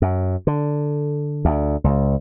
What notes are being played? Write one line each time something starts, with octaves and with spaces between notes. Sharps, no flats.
F#2
D3
D2
C#2